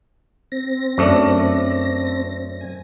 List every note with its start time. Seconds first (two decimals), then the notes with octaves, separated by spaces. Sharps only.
0.52 C4 A#6
0.98 F#2 A3 D4
2.61 G#5